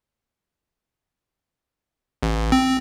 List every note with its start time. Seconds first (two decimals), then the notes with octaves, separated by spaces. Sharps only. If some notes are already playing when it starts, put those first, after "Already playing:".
2.23 A1
2.52 C4